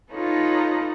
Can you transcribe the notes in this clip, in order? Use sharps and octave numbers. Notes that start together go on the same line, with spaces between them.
D#4 F4 A4 B4 C#5